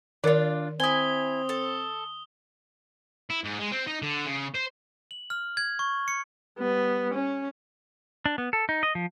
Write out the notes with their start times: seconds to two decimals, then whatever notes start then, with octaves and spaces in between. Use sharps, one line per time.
0.24 D#3 D4 F4 A#4 D5
0.80 C4 E4 G#5 D#6 G7
1.49 A4
3.30 E4
3.44 G#2
3.59 G#3
3.72 C4
3.87 D#4
4.02 D3
4.26 C#3
4.54 C5
5.11 F#7
5.30 F6
5.57 G#6
5.79 C#6
6.08 C#7
6.59 G3 B3
7.15 C#4
8.26 D4
8.38 B3
8.53 A4
8.69 D#4
8.83 D#5
8.95 F3